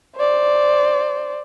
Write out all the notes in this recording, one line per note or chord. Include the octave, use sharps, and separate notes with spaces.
C5 D5